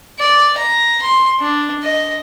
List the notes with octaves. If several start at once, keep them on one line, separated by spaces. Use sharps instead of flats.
D5
A#5
C6
D4
D#5